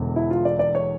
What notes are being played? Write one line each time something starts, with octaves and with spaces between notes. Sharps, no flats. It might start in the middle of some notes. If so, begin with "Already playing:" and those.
Already playing: E1 E2 D3
E4
F4
D5
D5
C#5